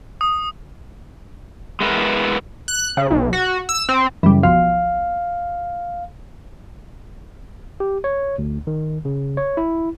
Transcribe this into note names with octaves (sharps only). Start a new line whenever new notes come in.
D#6
G#3 B3 E4 A#4 B4
F#6
C#3
B1
F#4
E6
C4
F#2 C#3 E3 G3
B1 F3 F5
G4
C#5
D2
D#3
C#3
C#5
E4